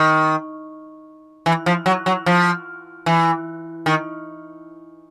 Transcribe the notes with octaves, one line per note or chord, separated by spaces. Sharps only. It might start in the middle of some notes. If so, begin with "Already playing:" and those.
Already playing: D#3
E3
F3
F#3
F#3
F3
E3
D#3